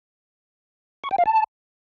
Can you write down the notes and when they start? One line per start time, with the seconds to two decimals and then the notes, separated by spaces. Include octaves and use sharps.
1.04 C#6
1.11 G5
1.18 F5
1.26 A5